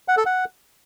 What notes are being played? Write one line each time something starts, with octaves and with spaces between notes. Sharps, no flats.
F#5
A4
F#5